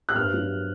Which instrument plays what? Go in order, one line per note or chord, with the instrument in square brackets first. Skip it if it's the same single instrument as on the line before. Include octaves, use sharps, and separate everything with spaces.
[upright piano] F#6
G2 F6
F#3